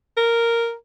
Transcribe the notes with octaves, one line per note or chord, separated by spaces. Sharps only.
A#4